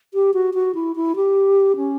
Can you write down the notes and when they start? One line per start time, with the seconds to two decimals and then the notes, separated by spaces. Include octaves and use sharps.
0.14 G4
0.34 F#4
0.54 F#4
0.75 E4
0.96 E4
1.16 G4
1.77 C#4